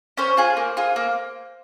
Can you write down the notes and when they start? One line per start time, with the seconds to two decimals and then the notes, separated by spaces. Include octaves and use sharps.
0.17 C#4 C5
0.37 F4 G#4
0.57 A#3
0.77 F4 G#4
0.96 A#3